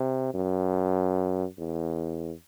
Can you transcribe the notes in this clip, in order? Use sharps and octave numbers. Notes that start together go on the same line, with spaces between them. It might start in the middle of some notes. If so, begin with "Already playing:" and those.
Already playing: C3
F#2
E2